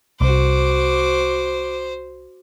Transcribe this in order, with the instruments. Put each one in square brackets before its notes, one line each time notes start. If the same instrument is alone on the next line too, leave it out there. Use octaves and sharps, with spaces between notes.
[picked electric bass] C2 [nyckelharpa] F#4 D6 [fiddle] C5